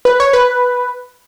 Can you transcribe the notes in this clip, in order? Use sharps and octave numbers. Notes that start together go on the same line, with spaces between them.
B4
C#5
B4